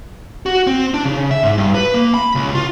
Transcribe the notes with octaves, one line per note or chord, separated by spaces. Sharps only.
F#4
C4
D4
C#3
E5
G#2
G2
B4
A#3
B5
C#2
F4